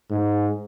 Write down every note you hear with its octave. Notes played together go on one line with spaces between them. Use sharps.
G#2